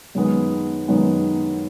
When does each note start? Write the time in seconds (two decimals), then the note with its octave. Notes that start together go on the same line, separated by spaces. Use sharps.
0.15 F#2 D#3 G#3 B3
0.88 F#2 D#3 G#3 B3